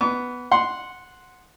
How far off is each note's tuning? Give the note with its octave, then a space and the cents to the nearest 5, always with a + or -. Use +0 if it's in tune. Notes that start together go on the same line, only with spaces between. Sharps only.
B3 +0 D6 -45
F#5 -10 C6 +0